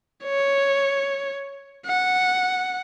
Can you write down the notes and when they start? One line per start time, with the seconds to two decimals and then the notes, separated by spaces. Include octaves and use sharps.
0.24 C#5
1.86 F#5